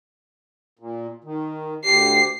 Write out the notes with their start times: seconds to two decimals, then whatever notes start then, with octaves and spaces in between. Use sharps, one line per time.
0.79 A#2
1.24 D#3
1.85 D2 G4 C7